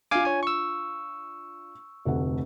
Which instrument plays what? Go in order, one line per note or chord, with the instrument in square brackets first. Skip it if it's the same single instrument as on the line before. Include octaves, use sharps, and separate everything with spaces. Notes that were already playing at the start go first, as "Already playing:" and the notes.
[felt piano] D4 F4 [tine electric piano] F5 G#5 D6
[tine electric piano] C#5 G#5
C#6 E6
[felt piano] F1 D2 F#5